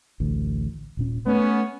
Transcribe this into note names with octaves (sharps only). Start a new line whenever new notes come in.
A1 D2
D#1 A#2 C#4
A3 B3 C#4